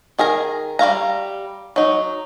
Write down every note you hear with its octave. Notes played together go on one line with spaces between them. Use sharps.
D#3 G#4 A#4 A#5
G3 C#5 F5 A#5
F#3 D#4